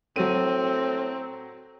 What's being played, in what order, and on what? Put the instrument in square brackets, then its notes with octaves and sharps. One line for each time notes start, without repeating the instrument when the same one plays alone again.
[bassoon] A2 [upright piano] F#3 D#7 [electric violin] C4